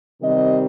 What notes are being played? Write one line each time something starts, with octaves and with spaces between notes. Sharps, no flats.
C3 D#3 G3 C4 D#5